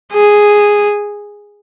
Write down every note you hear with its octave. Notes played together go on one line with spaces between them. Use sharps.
G#4